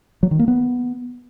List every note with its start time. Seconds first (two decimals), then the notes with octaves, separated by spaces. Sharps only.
0.23 F#3
0.31 D#3
0.39 A#3
0.48 B3